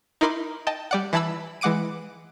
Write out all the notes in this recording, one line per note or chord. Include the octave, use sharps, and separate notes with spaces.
D#4 E4 A#4 B5 C6 D6
D#5 G5 A5
G3 D5 F#5
E3 E4 A5 B5 E6
E3 G#3 F#5 D6 D7 D#7